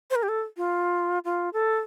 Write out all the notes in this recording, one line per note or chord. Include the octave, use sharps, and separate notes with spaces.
C5
A#4
G4
A4
F4
F4
A4